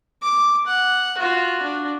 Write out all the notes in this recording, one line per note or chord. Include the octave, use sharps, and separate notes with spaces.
D6
F#5
F4 F#4
D4